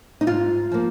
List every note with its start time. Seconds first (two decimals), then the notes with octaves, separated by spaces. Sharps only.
0.21 D#4
0.27 G#2 F4
0.71 F3 A#3